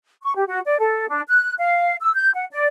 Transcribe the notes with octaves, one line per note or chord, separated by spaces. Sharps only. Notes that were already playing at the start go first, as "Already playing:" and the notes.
C#6
G4
F#4
D5
A4
D4
F#6
F5
E6
G6
F#5
D5